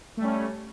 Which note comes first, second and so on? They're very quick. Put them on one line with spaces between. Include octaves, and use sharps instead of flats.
A3 G3 C#4